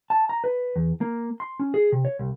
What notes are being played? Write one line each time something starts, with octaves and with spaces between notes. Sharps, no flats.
A5
A#5
B4
E2
A#3
C6
C#4
G#4
C3
C#5
C2